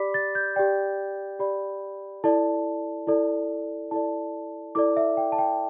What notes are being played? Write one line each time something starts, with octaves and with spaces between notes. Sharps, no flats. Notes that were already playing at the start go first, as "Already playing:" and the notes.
Already playing: G4 D5 B5 D6 B6
A6
G6
G4 D5 G5
G4 D5 B5
E4 A4 D5 A5
E4 A4 D5
E4 A4 D5 A5
E4 A4 D5 D6
E5
G5
A5
G5